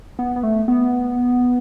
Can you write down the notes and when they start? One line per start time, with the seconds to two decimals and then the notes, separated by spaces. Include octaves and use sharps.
0.19 B3
0.36 B3
0.43 A3
0.68 B3